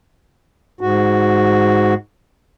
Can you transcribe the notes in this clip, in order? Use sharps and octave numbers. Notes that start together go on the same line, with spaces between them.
G#2 F#4